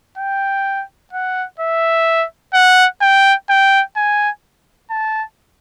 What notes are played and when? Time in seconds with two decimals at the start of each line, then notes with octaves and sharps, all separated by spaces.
0.18 G5
1.13 F#5
1.60 E5
2.54 F#5
3.01 G5
3.50 G5
3.97 G#5
4.91 A5